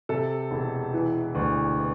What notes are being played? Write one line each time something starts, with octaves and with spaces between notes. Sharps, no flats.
C3 A4
E1
E3
D2